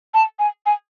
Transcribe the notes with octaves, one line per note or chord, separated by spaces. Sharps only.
A5
G#5
G#5